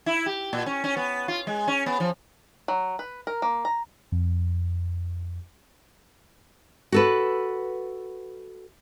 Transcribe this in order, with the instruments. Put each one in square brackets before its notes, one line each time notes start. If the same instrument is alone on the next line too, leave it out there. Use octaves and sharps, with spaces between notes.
[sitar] E4
G4
A#2
C#4
C#4
B3
F4
G#3
C#4
B3
F3
[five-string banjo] F#3
B4
A#4
A#3
A#5
[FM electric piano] F2
[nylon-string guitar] F#4 A4 B4